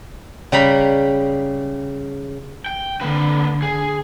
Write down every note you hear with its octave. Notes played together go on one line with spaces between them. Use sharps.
C#3 G3 A#5 B5
G5
D3 A#3 B4
G#4